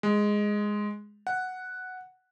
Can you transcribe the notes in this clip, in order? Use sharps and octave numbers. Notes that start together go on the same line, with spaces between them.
G#3
F#5